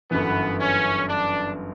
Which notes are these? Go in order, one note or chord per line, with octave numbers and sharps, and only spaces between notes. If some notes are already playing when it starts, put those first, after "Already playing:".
G1 F#2 E3 B3
C#4
D4